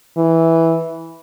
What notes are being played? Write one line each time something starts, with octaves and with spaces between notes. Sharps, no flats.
E3